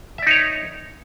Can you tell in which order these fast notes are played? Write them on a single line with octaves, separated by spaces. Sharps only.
E5 D5 D#4 C#5